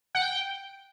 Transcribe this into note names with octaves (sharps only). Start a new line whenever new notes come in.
F#5
G5